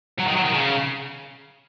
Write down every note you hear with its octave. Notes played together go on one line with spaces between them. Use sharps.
F#3
D#3
F#3
D#3
C#3